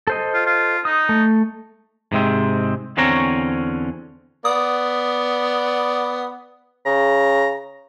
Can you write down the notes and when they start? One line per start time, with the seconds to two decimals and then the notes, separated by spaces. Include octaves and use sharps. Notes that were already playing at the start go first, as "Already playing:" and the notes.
0.07 A4 C5 D#5
0.33 F4
0.46 F4
0.85 D#4 D#6
1.09 A3
2.12 G#2 C3 G#3 C4
2.97 E2 D3 C4 C#4 C#5 A#5
4.45 B3 D5 D#6
6.86 C#3 A#5